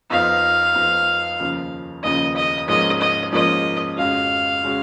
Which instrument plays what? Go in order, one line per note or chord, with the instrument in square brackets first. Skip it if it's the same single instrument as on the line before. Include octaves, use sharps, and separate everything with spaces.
[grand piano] F2 F3 B3 D#4 [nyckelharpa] F5
[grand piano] F2 F3 B3 D#4
D#2 C#3 F3
[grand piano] D#2 C#3 F3 [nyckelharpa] D#5
[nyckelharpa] D#5
[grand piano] G#2 F3 A#3 C#4 [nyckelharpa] D#5
[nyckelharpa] D#5
[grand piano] G#2 F3 A#3 C#4 [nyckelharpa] D#5
[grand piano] F2 C#3 G#3 C#4 F#4 [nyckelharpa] F5
[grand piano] C#3 G#3 C#4 F#4